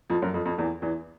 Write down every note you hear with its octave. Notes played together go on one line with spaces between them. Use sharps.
F2 F3
F#2 F#3
F2 F3
F2 F3
E2 E3
E2 E3